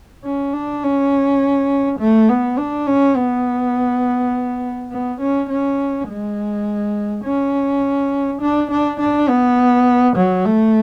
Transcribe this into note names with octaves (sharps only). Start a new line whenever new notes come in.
C#4
D4
C#4
A3
B3
D4
C#4
B3
B3
C#4
C#4
G#3
C#4
D4
D4
D4
B3
F#3
A3